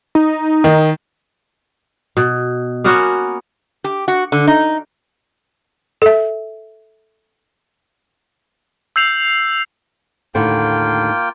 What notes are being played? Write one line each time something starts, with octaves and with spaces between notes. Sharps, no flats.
D#4
D#3
B2
A#3 B3 C#4 F#4
G4
F#4
D3
D#4
A4 E5
E6 G6 C7 F7
D#2 A2 D3 A#3 F4 G5